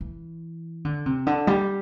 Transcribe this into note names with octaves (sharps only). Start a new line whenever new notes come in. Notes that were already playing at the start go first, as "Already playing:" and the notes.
E3
D3
C3
D3
G3